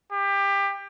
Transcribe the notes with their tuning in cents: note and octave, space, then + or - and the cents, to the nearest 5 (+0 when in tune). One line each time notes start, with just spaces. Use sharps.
G4 +25